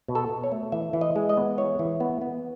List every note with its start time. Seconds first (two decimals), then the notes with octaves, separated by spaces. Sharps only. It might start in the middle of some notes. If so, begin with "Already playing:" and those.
0.08 B2
0.15 A4
0.29 B2
0.44 C#5
0.52 A3
0.72 E3 E5
0.93 E3
1.01 D#5
1.16 G#3
1.29 D#5
1.37 B3
1.58 E3 C#5
1.79 E3
2.00 B3
2.21 B3